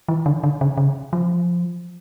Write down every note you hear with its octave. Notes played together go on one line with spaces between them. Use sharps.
E3
D3
D3
C#3
C#3
F3